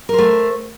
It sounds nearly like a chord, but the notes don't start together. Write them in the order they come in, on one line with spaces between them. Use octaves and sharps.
A#4 C5 A3